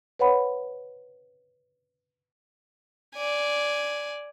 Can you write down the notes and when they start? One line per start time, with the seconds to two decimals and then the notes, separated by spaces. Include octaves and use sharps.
0.19 B4 C#5 F#5 B5
3.15 D5 G#5